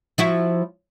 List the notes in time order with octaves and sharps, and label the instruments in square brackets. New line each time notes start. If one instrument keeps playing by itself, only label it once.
[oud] F3 E4 F#4